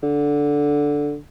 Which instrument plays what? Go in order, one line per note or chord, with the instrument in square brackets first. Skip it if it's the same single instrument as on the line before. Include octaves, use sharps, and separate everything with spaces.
[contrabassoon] D3